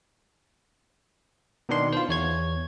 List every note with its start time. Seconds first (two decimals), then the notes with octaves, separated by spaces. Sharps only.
1.69 B2 D#3 D4 C6
1.93 F4 C5
2.09 E2 C#5 G#6